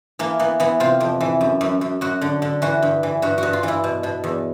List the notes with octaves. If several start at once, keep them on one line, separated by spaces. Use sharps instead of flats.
E3 A#3
E3 B3
E3 B3
C3 F4
F2
E3
F#2
F#2
F#2
F#2 F#4
D3
D3
E3 F#4
G2
E3
G2 F#4
G2 F#4
F4
E3 E4
B2
B2
E2